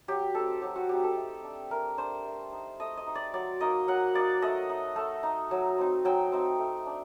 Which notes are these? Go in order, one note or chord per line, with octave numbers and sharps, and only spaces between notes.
F#3 G4
C4 D#4 A4
F#3 G4
F#4
C4 D#4 G4
A4
A3
D4
A3 A#4
D4 C5
A3
D#4
A3 D#5
D#5
D#4
D5
F#3 D5
A#3 D#4 D#5
F#3 F#5
A#3 D#4 D5
A3 D#5
D#4
A3
D#4
F#3
C4 D#4
F#3 G5
C4 D#4
A3
D4